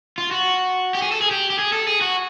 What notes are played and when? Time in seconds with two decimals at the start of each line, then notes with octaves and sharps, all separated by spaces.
0.18 F4
0.31 F#4
0.95 G4
1.02 G#4
1.12 A4
1.21 G#4
1.31 G4
1.50 G4
1.59 G#4
1.73 A4
1.87 G#4
2.01 F#4